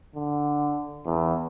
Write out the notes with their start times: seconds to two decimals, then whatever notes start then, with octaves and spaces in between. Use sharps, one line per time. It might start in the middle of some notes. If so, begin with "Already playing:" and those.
0.15 D3
1.05 E2